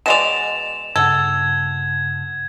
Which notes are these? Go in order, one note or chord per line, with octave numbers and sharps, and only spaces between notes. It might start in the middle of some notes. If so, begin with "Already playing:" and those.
B2 G#3 D5 E7 F7
G2 C#3 A4 F#5 G#6